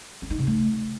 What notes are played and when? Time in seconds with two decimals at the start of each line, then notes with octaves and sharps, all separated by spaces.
0.22 C#4
0.30 D#4
0.39 C3
0.47 A3